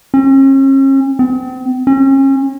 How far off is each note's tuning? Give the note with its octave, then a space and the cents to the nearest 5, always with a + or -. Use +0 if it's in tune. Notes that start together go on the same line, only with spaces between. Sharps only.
C#4 -40
C4 -40
C#4 -35